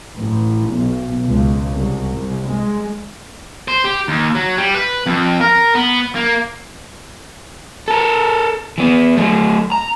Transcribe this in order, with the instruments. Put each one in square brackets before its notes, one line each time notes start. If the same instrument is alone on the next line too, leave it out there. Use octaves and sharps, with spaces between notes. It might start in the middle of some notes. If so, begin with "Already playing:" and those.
[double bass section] A1
B1
C#2
C2
C2
G#3
[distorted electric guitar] C5
G4
D#2
F#3
G3
B4
F2
A#4
B3
A#3
[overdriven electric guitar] A4 A#4
E3 B3
F#3 A3
A#5